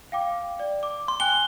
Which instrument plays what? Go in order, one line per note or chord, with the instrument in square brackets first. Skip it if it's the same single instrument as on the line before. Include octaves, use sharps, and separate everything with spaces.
[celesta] F5 G5 D6
D5
D6
[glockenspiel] C6
[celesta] G5 G#5 F#6 [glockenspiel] G7